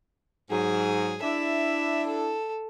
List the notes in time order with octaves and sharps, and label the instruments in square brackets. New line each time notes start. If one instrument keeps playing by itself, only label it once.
[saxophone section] G#2 F#3 [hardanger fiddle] G#4
[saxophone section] D4 E4 [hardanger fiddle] E5
[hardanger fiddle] A4